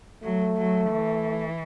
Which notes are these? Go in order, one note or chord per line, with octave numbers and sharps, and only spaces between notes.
F#3 A3
F#3
E3